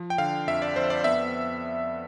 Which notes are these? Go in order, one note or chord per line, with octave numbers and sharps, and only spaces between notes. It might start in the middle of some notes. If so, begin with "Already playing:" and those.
Already playing: F3
G5
D3 F5
F2 E5
D5
F2 C5
D5
B3 E5